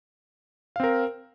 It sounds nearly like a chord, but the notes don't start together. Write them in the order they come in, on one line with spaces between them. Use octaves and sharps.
F5 C4 A#4